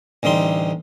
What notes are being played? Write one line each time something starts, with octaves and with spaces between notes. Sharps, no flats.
A1 D2 G3 D#4 C6